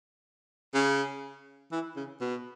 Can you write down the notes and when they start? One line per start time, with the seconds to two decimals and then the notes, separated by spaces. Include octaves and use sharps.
0.74 C#3
1.72 E3
1.96 C#3
2.21 B2